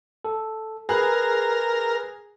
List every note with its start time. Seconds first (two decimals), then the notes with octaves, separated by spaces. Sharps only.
0.25 A4
0.89 G#4 A#4 B4 F#6